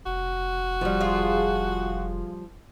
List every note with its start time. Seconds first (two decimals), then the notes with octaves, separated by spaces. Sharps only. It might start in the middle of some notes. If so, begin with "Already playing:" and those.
0.06 F1 F#4
0.81 F3 G3
1.01 F4 G#4